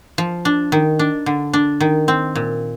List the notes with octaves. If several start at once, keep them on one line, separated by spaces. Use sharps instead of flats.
F3
D4
D#3
D4
D3
D4
D#3
C4
A#2